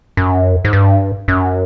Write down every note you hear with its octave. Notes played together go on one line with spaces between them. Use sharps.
F#2
G#2
G2
F#2